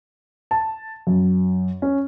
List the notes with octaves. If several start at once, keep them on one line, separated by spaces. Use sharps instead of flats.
A5
F#2
C#4